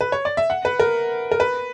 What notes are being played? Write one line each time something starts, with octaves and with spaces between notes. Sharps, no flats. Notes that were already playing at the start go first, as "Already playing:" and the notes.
B4
C#5
D5
E5
F#5
B4
A#4
A#4
B4